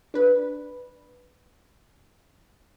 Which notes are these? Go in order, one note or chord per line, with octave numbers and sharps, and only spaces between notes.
D4 B4